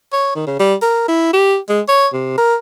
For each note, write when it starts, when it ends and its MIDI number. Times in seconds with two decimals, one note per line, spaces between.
0.13 0.31 73
0.36 0.43 51
0.47 0.59 49
0.60 0.75 55
0.82 1.05 70
1.08 1.29 64
1.33 1.57 67
1.69 1.81 56
1.88 2.08 73
2.13 2.35 48
2.38 2.55 70